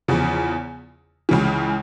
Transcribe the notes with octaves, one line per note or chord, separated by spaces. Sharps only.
E2 C#3 F3
C#2 C#3 E3